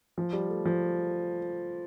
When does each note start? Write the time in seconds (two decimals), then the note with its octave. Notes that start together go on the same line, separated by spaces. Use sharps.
0.18 F3
0.33 G3
0.50 A3
0.65 F3